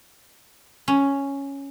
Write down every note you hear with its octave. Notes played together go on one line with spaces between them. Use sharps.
C#4